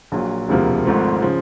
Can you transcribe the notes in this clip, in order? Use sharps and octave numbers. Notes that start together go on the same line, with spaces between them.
A#1 A#2 F#3
E1 D2 C3 F3 A#3
G#1 G#2 F3 A3 C4
C#3 F3